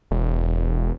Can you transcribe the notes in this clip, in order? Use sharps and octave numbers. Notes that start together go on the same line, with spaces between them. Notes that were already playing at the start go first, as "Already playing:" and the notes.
E1